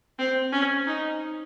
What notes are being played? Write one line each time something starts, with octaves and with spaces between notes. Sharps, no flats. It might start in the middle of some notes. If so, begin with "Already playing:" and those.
C4
C#4
D#4